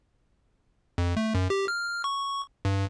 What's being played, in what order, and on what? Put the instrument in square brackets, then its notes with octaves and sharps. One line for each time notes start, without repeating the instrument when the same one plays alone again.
[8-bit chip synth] F2
A3
F#2
G4
F6
C#6
G2